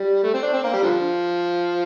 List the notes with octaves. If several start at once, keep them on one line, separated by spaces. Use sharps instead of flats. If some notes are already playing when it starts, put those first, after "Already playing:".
Already playing: G3
A3
C4
D4
C4
A#3
G3
D3 F3